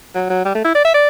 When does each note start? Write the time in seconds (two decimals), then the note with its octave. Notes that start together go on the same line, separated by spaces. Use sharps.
0.15 F#3
0.30 F#3
0.45 G3
0.55 A3
0.65 E4
0.75 D5
0.85 E5
0.94 D5